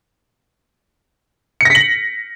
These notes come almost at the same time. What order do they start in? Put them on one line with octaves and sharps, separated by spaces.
C#7 A#6 B6 F#7